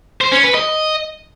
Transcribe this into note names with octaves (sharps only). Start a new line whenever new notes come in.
C5
C#4
B4
D#5